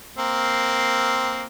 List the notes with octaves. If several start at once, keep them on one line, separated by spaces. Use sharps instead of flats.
A#3 C4